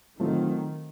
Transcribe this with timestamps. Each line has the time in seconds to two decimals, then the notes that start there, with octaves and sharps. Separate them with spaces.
0.19 D#3 F#3 A3 C4 F4